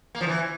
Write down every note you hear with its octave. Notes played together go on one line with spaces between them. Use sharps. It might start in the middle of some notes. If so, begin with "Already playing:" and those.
A#3
F3
E3